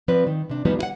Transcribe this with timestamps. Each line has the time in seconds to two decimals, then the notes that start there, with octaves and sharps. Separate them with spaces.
0.08 F3 C4 B4 D5
0.27 D#3
0.50 C3 D4
0.65 E2 E3 F3 G3 B3 D#4
0.79 E4 F#5